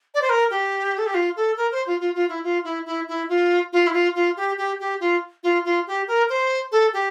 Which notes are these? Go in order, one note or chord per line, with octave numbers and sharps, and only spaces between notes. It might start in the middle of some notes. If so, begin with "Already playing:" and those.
D5
C5
A#4
G4
A4
G4
F4
A4
A#4
C5
F4
F4
F4
E4
F4
E4
E4
E4
F4
F4
E4
F4
F4
G4
G4
G4
F4
F4
F4
G4
A#4
C5
A4
G4